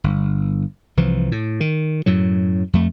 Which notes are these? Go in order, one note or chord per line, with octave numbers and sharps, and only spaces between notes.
G1
C2 E3 F3
A2
D#3
F#2 A2 F#3
F2 A3